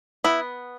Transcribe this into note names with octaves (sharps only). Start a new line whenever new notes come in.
B3 E4